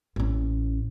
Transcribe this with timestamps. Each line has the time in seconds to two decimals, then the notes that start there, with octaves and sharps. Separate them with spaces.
0.16 A1 C#4